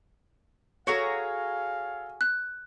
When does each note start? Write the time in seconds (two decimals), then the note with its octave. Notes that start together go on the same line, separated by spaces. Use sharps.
0.87 F#4 G#4 A4 C#5 F5 A#5
2.21 F#6